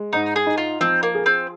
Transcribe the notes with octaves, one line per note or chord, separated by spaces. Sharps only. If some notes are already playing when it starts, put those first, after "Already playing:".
Already playing: G#3
G#2 D#4
G#4
D#4
F4
F3 C4
A#3
G#4
C4